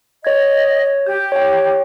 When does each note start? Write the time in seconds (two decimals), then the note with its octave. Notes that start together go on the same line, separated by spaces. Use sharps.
0.25 C#5 D#5 G#6
1.06 G4 G6
1.32 C#5 G5